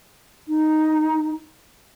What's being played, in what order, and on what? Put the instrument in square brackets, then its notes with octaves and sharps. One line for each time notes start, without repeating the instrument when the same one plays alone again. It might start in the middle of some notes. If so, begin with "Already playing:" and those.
[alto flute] D#4